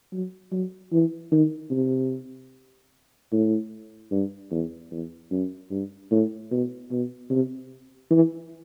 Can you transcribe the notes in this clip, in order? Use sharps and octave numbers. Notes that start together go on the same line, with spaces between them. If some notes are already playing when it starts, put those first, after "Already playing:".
F#3
F#3
E3
D#3
C3
A2
G2
E2
E2
F#2
G2
A2
B2
B2
C3
E3